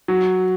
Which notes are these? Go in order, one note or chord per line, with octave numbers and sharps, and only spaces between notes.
F#3